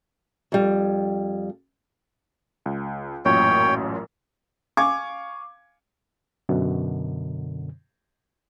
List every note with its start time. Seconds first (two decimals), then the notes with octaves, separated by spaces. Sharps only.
0.52 F2 G3
2.66 C#2
3.25 A1 F#2 A#2 C#5 G5
4.77 F5 G#5 C#6 D6 G#6
6.49 F#2 B2 D3